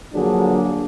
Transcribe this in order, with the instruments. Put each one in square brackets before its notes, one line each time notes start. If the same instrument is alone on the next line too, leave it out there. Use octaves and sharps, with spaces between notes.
[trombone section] D3 F3 F#3 A#3 D4 G#4